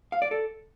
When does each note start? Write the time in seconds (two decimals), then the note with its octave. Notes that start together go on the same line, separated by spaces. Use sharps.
0.12 F5
0.22 D5
0.31 A4